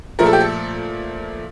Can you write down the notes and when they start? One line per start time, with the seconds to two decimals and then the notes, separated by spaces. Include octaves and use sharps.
0.19 A#2 F3 A3 A#4
0.26 A4
0.33 G4
0.41 A4